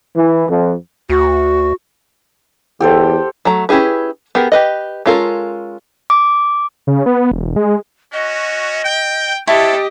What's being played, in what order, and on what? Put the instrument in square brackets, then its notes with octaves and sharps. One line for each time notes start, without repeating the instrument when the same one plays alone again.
[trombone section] E3
F2
[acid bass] D2 [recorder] F#4
[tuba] E2 [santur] G4 A4 C5
[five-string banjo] F#3 A3 A#5
C#4 E4 G4 G#4 B4
B3 G4 G#4 A#4
G4 B4 D#5
G#3 C#4 F4 A4 A#4
[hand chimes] D6
[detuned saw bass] C#3
B3
E1
G#3
[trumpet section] C#4 F#4 [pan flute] D#5
[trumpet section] G5
[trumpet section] D4 A4 [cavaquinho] E4 C#5 A5 [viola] G4 D#5 [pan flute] G5